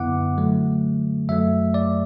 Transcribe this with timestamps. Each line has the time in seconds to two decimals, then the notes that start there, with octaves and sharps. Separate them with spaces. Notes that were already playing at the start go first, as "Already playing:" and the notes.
Already playing: F#2 D3 B3 E4 F#5 D6
0.37 D3 F#3 A3
1.29 F#2 F#3 A3 E5
1.74 D5